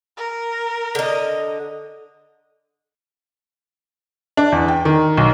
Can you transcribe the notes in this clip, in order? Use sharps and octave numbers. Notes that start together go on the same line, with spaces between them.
A#4
D3 D#5
D4
E2
G5
D#3
B1